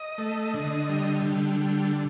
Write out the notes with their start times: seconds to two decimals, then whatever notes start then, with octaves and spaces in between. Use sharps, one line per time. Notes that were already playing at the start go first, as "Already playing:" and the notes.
Already playing: D#5
0.18 A3
0.54 D3
0.89 G3
1.25 D3
1.60 G3